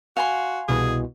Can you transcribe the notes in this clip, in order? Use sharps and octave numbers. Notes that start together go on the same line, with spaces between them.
F#4 F5 G#5 C6
C2 B2 E3 G#4